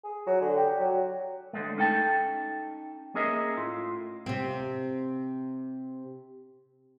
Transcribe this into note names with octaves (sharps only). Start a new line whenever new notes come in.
G#4
F#3
D3
G4
F#3
D3 G#3 A3
C#4 D#4 A4 G5 A5
A#3 C#4 G#4 A#4 D#5 E5
A2 F4
C3 C4